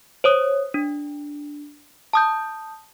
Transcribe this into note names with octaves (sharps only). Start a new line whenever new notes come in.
C5 C#5 D#6
D4
A5 D#6 G6